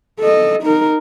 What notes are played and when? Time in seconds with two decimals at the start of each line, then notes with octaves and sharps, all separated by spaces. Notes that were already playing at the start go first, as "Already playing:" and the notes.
0.20 A4 D#5
0.63 D#4 A#4